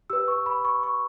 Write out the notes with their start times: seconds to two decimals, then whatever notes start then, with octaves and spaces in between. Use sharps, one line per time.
0.10 G4 B4 E6
0.28 C#6
0.46 B5
0.65 C#6
0.83 C#6